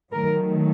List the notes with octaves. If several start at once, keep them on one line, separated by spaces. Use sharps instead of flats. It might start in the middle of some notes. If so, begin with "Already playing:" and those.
D#3 F#3 A3 A#4